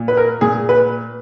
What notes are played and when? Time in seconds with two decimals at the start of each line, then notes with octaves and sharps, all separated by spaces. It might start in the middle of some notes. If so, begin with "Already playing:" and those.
Already playing: A#2
0.08 B4
0.17 A#4
0.41 A#2 G#4
0.69 B4